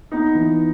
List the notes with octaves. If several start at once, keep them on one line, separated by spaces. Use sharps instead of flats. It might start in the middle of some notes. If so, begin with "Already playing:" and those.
B3 D#4
E3